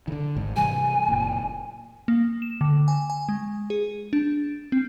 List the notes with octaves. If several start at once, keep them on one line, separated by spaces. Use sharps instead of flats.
D3 D#3
G#1 G#2
C3 E3 G3 G#5
F#1 A#2
A#3
E7
D3
G#5
G#5
G#3
G#4
D4
C4